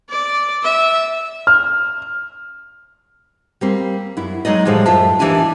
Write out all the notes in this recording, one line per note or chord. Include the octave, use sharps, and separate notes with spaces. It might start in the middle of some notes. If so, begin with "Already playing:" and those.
D5
E5
F6
G3 A#3 C4
F#2 E4
F#3 G#3 D#4 D5 D#5
A2 E3 F3 G3 G#3
F#2 F4 C5 E5 A5
D#2 E3 D4 G4 G#5 A5